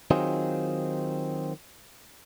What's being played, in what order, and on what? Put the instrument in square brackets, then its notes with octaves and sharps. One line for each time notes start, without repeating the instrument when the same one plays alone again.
[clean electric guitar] D#3 F#3 C4 D#4 F4 G#4